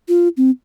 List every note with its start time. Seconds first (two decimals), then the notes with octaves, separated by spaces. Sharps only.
0.08 F4
0.37 C4